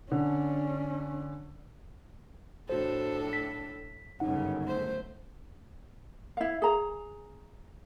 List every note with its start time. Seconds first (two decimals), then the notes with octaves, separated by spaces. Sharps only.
0.12 D3 C#4 D4
2.69 A2 D4 F#4 A4 C5
3.33 B6
4.20 G1 F#2 C#3 C#4 D#4 F#5
4.64 A3 C5
6.37 E4 F5
6.62 G#4 A#5